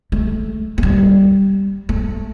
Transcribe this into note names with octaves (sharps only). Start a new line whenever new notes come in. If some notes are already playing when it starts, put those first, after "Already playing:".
A3
A3
G3
A3